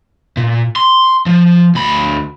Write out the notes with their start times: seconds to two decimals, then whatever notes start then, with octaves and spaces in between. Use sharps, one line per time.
0.37 A#2
0.76 C6
1.26 F3
1.75 D2 B5